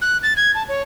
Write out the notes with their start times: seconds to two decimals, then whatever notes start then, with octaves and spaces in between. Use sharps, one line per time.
0.02 F#6
0.23 A6
0.37 G#6
0.55 A5
0.69 C#5